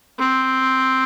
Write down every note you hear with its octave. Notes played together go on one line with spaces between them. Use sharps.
C4